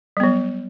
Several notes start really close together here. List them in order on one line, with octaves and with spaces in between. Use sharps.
G3 B3 F#3